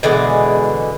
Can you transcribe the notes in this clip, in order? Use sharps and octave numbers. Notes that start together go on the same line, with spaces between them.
B2 D3 E3 G#3